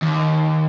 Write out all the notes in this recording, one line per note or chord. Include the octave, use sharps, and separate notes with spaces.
D#2